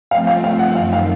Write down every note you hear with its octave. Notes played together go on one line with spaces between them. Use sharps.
F3 A3 C4 F5
F5
F5
F#5
F#2 D#3 A3 F5
F5